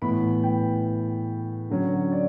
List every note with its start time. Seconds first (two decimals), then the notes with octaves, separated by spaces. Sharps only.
0.02 A2 E3 B3 B5
0.43 G5
1.70 D3 F#3 C#4
2.12 D5